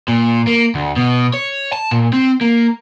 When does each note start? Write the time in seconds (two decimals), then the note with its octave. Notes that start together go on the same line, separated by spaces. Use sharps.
0.08 A#2
0.47 A#3
0.75 D2
0.96 B2
1.34 C#5
1.73 A5
1.91 A#2
2.13 C4
2.41 A#3